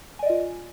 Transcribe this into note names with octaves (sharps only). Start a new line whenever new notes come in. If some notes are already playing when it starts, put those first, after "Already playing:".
F4 D5 D#5 G#5